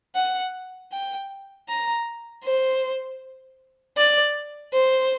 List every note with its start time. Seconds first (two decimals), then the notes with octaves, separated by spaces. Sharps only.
0.15 F#5
0.92 G5
1.68 A#5
2.44 C5
3.97 D5
4.73 C5